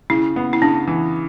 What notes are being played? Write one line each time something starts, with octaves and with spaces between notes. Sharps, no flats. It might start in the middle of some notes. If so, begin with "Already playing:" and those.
C#3 E4
B3
E4
C#3 D4
E3